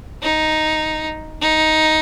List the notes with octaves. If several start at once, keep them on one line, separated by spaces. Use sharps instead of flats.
D#4
D#4